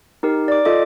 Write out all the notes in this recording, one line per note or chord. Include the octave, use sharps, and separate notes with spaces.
D#4 G4 A#4
D5 D6
F4 A4 D#5 D6